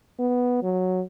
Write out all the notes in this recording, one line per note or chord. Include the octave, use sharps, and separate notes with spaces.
B3
F#3